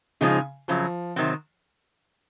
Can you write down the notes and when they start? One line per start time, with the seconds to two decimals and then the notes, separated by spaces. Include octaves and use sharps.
0.21 G#2 C#3 F3 G#3 D#4
0.68 F#2 C#3 F3 F#3
1.16 C3 D#3 F#3 C4